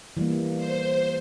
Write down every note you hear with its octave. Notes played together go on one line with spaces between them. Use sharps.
E3 G3 A#3
C5